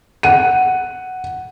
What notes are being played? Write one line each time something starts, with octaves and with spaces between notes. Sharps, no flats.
F#5 D#7